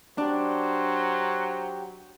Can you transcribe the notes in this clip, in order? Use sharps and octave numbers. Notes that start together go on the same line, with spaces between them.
F#3 D4 G4 C5